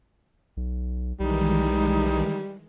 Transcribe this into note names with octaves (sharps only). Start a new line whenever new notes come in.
B1
B1 D#3 E3 G3 G#3 D#4